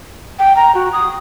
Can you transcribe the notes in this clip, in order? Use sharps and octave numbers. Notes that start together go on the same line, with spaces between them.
G5
A#5
F#4
D#6